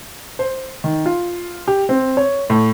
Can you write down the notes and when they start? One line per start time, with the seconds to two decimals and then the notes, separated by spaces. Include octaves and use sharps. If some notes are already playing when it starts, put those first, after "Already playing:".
0.39 C5
0.84 D#3
1.06 F4
1.68 G4
1.89 C4
2.17 C#5
2.50 A2